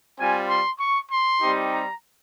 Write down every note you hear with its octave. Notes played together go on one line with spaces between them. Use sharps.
G3 C4 F4 G#5
C6
C#6
C6
G3 C4 D#4 G4
A#5